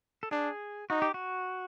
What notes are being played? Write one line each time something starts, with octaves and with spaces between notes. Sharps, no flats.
A4
D4 G#4
D#4 F#4
G4
F#4